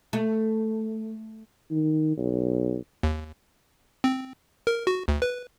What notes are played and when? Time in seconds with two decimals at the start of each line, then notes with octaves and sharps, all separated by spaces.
0.13 A3
1.71 D#3
2.17 B1
3.03 D#2
4.04 C4
4.67 A#4
4.87 F#4
5.08 D2
5.22 B4